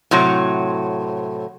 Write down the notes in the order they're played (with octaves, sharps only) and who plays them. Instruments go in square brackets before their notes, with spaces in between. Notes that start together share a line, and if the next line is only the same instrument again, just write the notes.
[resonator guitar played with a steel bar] A2 C3 F#3